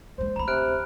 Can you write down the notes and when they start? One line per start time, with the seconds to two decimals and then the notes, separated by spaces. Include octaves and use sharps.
0.18 D#2 G#3 C5
0.36 D2 D3 A#5 B5
0.48 C3 F6 F#6 D7